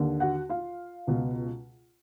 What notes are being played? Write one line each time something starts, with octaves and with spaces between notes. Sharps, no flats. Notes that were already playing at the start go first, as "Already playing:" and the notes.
Already playing: D#2 D3
F#4 F#5
F4 F5
C#2 B2